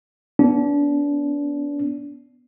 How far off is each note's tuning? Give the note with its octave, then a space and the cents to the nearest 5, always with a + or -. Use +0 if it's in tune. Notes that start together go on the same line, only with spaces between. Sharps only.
B3 +0 D4 -30